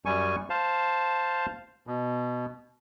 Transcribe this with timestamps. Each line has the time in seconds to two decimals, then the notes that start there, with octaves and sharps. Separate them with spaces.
0.06 F#2 G3 G#5 C#6
0.50 C5 F5 A5
1.87 B2